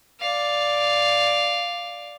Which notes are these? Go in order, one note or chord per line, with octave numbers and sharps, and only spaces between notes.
D5 F5